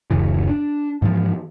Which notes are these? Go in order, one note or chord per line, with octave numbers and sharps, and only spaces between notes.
D1 F#2 C#3 E3
D4
G#2 E3 F3